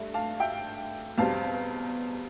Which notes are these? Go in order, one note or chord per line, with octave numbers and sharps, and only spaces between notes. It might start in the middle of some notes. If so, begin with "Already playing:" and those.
Already playing: G2 A3
F5 A5
E5 G5
E2 B2 G3 C4 F5 A5